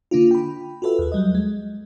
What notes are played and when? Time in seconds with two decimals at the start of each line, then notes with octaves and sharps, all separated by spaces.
0.11 D3 A#3 D4 F4
0.31 G5 B5
0.82 F4 F#4 A4 B4 E5
0.99 D#2 G#4
1.12 F#3 G3 D#5
1.35 G#3